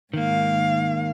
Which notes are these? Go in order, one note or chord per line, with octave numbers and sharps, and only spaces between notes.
G#2 D#3 A#3 F5